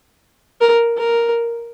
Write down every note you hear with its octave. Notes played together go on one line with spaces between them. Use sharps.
A#4
A#4